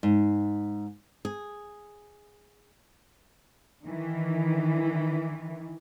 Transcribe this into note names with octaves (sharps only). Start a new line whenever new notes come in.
G#2
G#4
D#3 E3